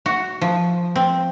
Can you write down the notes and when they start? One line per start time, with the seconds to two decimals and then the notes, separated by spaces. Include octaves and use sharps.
0.06 F#4
0.41 F3
0.96 C4